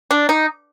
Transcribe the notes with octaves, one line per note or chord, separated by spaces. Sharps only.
D4
D#4